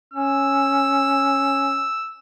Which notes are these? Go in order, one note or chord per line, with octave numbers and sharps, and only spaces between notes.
C#4 E6